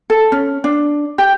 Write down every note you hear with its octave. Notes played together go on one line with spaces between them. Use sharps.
A4
C#4
D4
G4